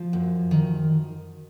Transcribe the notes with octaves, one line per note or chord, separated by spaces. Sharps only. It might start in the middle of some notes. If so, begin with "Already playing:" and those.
Already playing: F3
F#2
D#3